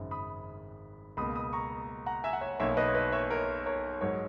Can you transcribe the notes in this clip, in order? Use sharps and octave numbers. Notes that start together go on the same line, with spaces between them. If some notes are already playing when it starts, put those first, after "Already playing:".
Already playing: G#1 F#2 C#3
B5 D#6
C#2 B2 A#3 B5 D#6
B5 D#6
A#5 C#6
F#5 A#5
E5 G#5
F#5
C#5 E5
B1 B2 A#3 C#5 E5
B4 D#5
C#5
B4 D#5
C#5 E5
A#4 C#5
A#4 C#5
G#2 F#3 A#4 C#5